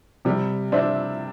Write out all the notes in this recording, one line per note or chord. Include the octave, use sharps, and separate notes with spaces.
C3 G3
D4 C5 E5